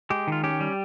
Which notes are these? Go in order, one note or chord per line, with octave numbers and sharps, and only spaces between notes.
G#3 G4
D#3 F4
C#4 G4
G3